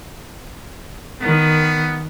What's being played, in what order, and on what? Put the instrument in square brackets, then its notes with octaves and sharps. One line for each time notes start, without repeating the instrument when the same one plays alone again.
[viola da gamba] D#3 [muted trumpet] B3